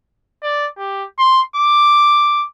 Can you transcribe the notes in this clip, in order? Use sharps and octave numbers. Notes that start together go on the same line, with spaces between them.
D5
G4
C6
D6